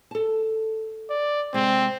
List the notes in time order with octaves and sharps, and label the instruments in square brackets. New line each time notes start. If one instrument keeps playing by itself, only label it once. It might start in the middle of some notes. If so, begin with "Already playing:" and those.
[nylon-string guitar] A4 A5
[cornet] D5
[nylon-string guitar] C3 G#3 [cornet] C4